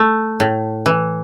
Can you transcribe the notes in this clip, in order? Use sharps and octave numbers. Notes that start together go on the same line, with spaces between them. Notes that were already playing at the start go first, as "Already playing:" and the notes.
Already playing: A3
A2
E3